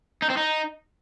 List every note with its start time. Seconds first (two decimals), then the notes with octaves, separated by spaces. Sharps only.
0.22 D#4
0.30 C4
0.37 D#4